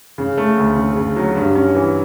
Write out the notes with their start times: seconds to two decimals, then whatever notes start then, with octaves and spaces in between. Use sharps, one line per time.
0.18 C#3
0.37 A3
0.57 D2
0.77 C#3
0.96 C#3
1.16 F#3
1.36 G2
1.55 C#4
1.75 E3